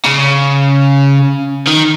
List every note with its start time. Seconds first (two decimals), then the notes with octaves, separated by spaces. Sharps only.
0.05 C#3
1.67 D#3